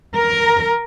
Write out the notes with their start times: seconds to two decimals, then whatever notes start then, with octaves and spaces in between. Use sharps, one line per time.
0.15 A#4